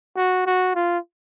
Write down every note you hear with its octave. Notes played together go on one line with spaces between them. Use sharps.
F#4
F#4
F4